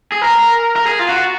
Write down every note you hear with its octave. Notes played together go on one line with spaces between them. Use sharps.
G#4
A#4
A#4
G#4
F4
F#4